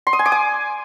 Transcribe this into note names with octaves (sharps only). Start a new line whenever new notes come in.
C6
D#6
G#5
D6
G#5